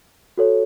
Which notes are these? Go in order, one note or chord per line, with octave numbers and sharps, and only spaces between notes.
F#4 A4 C#5